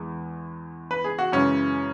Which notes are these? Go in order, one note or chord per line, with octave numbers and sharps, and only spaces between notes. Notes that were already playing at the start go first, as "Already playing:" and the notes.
Already playing: E2 E3 G#3
B4
G#4
F#4
F#2 C#3 E3 G#3 C#4